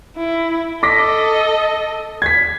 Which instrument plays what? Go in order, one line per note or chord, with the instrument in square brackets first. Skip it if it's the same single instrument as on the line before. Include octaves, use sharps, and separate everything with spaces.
[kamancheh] E4
[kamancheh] A4 D#5 [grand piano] D6 A#6 B6
[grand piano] G#6 B6